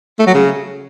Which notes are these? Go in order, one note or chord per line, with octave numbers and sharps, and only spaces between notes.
A3
F#3
C#3